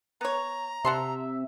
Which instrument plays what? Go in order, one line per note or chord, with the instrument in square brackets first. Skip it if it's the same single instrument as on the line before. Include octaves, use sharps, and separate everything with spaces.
[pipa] B3 C#5 [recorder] A#5
[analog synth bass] C3 [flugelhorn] E5 [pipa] F#5 A5 C6